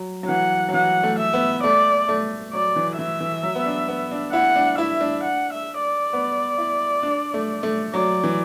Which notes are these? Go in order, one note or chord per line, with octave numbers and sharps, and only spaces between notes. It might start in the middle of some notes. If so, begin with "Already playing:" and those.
Already playing: F#3
F#3
E3 F#5
F#3
E3 F#5
A3
E5
B3
A3 D5
A3
F#3 D5
E3
E3 E5
E3
F#3
B3
D4
B3
D4
E4 F#5
D4
E4 E5
D4
F#5
E5
D5
B3
E4
D4
A3
A3
F#3 D5
E3